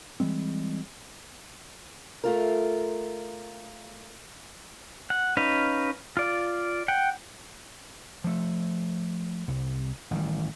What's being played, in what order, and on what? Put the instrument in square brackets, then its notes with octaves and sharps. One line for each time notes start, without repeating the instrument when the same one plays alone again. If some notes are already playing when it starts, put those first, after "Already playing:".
[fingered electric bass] E3 G3 G#3 C4
[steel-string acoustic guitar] A3 F4 A#4
[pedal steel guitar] F#5
C#4 D#4 B4 F5
F4 D5
F#5 G5
[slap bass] F3 A3
C2
A1 D#3 G3